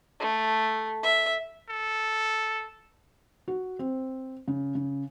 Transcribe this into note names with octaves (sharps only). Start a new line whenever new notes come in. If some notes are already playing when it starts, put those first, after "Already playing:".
A3
E5
A4
F#4
C4
C#3
C#3